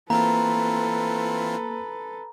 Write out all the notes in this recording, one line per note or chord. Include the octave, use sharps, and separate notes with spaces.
E3 A#3 C4 F4 A4 B4 A#5